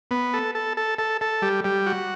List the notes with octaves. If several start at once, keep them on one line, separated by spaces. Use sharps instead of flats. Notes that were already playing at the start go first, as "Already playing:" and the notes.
B3
A4
A4
A4
A4
A4
G3
G3
F#4